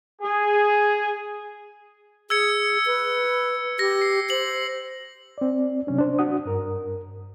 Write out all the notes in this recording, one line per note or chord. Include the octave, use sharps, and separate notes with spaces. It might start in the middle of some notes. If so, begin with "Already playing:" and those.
G#4
G#4 E6 G#6 C#7
B4
G4 A#6
C7
C5 F#7
C4 D5
C3 F#3 C#4 D4
D4 C5
D4 F#4 F#5 D#6
G2 A#4